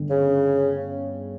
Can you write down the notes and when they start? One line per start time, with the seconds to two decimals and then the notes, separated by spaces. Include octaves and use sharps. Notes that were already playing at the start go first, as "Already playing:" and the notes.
Already playing: G1 G2 D3 G3
0.10 C#3